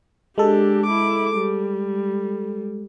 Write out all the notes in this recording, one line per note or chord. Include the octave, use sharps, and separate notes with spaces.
G#3 D4 G4 A4
E4 D6
G3